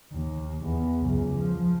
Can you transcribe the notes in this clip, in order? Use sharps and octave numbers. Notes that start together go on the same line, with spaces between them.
D#2
E2 B3
C#2 F#2
F3